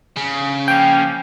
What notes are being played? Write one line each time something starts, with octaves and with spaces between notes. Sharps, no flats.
C#3
F3 A#3 C#4 G5